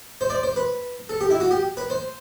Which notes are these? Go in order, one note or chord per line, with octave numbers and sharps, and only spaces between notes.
C5
D5
C5
B4
A4
G4
E4
F#4
G4
B4
C5